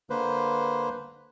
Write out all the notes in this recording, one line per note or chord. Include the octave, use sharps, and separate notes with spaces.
D3 A#3 B4 C5